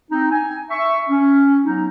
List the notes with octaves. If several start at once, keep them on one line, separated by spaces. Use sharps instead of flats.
C4 D#4
G#5
E5 C#6
C#4
F#3 B3 D#4